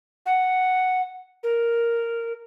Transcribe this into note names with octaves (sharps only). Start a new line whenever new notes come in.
F#5
A#4